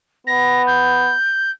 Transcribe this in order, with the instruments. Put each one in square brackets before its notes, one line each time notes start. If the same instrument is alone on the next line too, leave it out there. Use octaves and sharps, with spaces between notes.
[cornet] B3 [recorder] A#6
[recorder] G6